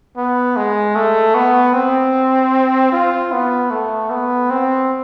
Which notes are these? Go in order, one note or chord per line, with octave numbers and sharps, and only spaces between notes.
B3
G#3
A3
B3
C4
F4
B3
A3
B3
C4